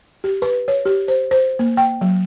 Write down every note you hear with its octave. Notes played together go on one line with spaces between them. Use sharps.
G4
B4
C#5
G4
C5
C5
A#3
G5
F#3